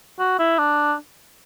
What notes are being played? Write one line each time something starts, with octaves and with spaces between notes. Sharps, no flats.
F#4
E4
D4